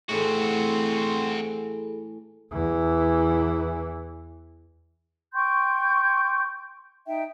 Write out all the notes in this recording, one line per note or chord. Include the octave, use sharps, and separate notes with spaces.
A2 E3 C4 F#4 G#4 A4
E2 E3
G5 C6 C#6 G6
D#4 E5 G5